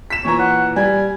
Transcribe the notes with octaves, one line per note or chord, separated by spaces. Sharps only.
B6 E7
A#2 E3 C#5 A#5
F#5
G3 G#5